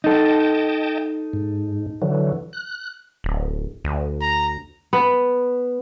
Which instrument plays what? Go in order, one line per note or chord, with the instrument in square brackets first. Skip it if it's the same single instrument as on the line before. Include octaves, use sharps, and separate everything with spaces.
[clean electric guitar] D#4 A4 [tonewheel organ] D#5 G5 A5
[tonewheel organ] G#2
D3 E3 F#3
F#6
[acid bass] D1
D2
[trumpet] A#5
[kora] B3